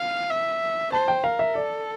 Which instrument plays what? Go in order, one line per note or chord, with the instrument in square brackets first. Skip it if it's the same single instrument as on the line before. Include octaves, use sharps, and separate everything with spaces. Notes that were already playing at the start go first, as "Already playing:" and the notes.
Already playing: [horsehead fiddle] F5
E5
[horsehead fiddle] C5 [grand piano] A5
[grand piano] G5
[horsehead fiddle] A#4 [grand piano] F5
[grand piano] E5
[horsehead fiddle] A4 [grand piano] D5